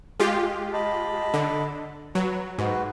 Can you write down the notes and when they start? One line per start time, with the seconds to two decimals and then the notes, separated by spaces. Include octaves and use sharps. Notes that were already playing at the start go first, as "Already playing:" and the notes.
0.20 G#3 F4 G4
0.73 D#5 A5 B5
1.34 D3
2.15 F#3 B4
2.58 G#2 F#4 B4